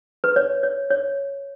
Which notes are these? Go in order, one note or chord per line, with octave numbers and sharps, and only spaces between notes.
B4
C#5
C#5
C#5